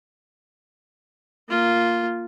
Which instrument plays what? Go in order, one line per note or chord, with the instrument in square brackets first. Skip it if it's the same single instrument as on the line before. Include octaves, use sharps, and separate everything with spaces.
[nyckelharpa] A#3 F4